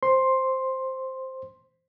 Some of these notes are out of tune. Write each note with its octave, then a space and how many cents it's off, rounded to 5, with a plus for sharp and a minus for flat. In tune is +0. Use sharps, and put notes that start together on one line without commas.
C5 +0 C6 +5